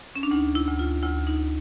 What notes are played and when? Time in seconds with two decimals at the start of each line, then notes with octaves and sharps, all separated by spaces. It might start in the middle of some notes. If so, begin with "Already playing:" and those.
0.16 C#4
0.23 D4
0.31 D2 D#4
0.55 E4
0.68 D2
0.79 F4
1.03 D2 E4
1.27 D#4